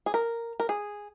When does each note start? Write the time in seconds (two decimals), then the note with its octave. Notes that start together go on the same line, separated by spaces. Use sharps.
0.06 G#4
0.14 A#4
0.60 A#4
0.69 G#4